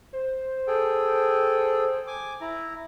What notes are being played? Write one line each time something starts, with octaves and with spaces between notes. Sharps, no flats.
C5
G#4 A4 G5
G#5 D6
E4 A#5